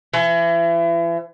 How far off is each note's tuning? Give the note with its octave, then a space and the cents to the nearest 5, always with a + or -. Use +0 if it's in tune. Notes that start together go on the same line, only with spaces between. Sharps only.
E3 +35